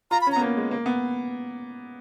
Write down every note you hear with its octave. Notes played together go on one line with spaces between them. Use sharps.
F4 A#5
B5
C#4
A#5
B3
A#3
G#3
A#3
B3